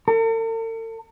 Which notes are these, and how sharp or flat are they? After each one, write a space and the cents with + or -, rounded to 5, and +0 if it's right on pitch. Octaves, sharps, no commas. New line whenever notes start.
A4 +45